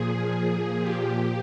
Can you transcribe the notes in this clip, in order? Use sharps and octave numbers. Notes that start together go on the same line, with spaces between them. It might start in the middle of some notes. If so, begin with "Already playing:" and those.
Already playing: A#2 F3 G#4
A#2 F3 G4